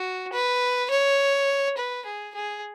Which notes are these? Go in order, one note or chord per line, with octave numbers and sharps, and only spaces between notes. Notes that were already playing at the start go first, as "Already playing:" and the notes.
Already playing: F#4
B4
C#5
B4
G#4
G#4